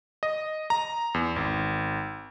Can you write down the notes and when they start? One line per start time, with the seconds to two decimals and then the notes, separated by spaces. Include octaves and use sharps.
0.23 D#5
0.70 A#5
1.14 E2
1.36 G#1